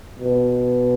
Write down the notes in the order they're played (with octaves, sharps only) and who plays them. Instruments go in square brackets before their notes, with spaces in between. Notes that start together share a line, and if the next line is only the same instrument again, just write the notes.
[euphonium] B2